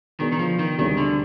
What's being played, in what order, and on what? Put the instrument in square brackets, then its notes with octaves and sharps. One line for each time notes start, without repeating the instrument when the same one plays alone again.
[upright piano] B2 B3 D4 G#4 [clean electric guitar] D#3
[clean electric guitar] D#3
F3
D#3
[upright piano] D2 C3 G3 D4 G#4 [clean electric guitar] D#3
[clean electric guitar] D3